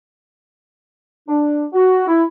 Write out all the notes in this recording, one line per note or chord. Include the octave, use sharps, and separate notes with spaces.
D4
F#4
E4